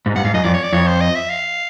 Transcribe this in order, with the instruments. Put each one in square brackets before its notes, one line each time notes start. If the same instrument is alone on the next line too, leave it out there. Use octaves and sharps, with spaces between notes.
[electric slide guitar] G#2
[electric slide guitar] G2 [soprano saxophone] F#5
[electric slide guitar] G#2 [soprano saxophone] F5
[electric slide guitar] F#2 [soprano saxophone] D#5
[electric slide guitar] F2 [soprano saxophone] D5
[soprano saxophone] C#5
D5
[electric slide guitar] F2 [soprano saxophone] C#5
[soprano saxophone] C5
D#5
E5
F5